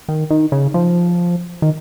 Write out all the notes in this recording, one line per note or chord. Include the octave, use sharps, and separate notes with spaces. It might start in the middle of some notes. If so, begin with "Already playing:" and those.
D#3
D#3
C#3
F3
D#3